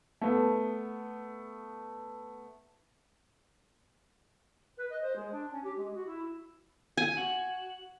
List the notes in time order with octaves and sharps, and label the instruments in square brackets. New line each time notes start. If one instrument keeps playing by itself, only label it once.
[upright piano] A3 B3
[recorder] B4
D#5
C5
G#3
D4
C#4
G4
G#3
F#4
E4
[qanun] G#5
[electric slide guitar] F#4